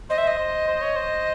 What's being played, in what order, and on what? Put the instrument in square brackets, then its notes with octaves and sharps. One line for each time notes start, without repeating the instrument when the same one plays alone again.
[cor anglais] C5 [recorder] D#5
[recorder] E5
D#5
[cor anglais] C5
C5
C#5
C5